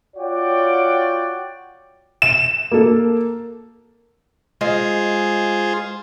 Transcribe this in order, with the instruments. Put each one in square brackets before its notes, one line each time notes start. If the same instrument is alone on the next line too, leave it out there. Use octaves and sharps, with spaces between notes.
[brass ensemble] F4 F#4 C#5 D5 F#5 G5
[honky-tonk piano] E7
[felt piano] A#3 A4
[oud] G#3 D#5 [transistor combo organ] F4 G#4 C5